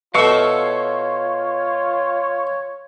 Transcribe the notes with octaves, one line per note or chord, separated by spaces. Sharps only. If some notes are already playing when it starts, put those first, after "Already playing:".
B2 A3 F4 C#5 F5 C#6 E6